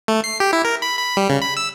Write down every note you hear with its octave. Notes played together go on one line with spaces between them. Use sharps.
A3
C7
G4
E4
A#4
B5
B5
G3
C#3
B5
E6